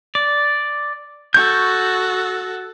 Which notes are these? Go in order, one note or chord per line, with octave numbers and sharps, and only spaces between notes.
D5
F#4 A4 C#6 G6